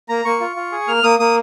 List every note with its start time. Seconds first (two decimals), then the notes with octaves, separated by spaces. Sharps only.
0.09 A#3 A#5
0.25 A#3 C#6
0.40 F4
0.56 F4
0.72 G#4
0.88 A#3 F6
1.03 A#3 D#6
1.19 A#3 D#6